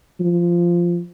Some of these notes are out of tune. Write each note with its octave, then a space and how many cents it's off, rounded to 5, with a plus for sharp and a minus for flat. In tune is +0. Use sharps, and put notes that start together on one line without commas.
F3 -10